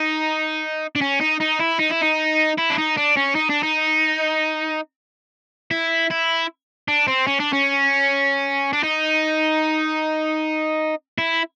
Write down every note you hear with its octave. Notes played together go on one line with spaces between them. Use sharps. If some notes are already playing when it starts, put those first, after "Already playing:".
Already playing: D#4
D4
C#4
D#4
D#4
E4
D#4
E4
D#4
E4
D4
D#4
D4
C#4
D#4
D4
D#4
E4
E4
D4
C4
C#4
D4
C#4
D4
D#4
E4